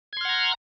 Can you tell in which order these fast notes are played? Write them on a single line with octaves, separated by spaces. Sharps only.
G#6 C6 F6 F#5 A#5